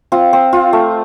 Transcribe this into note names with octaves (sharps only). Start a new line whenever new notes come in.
C4 F4
C4
F4
A3